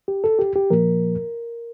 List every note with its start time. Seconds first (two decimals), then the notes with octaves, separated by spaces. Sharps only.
0.08 G4
0.24 A4
0.39 G4
0.56 G4
0.70 A#2 F3 A#3 A#4